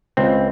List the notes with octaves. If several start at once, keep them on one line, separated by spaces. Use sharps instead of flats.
C#2 C4